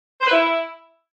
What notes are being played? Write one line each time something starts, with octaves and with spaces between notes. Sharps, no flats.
C5
B4
E4